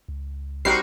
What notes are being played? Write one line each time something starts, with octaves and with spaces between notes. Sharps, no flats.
C#2
A#1 G3 C4 D4 D#4 F#4 A#4 C7